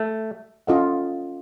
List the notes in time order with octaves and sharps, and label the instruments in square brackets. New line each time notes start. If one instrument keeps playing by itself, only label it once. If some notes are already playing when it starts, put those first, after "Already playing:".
Already playing: [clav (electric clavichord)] A3
[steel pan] C#4 F4 A4 D#5 F#5